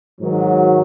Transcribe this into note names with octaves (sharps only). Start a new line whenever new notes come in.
G#2 D#3 F#3